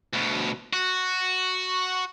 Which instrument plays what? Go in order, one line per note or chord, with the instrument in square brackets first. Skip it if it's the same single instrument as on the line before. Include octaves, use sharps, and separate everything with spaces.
[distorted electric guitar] D2 B2
F#4